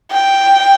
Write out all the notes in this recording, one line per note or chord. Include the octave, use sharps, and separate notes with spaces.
G5